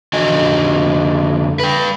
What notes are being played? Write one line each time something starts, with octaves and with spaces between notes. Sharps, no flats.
F2 D3 F#4 D#5 G#5
B4 G5